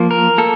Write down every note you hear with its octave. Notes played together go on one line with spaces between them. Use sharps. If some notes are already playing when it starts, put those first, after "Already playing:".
Already playing: F3 A#3
A#4
A#3 A4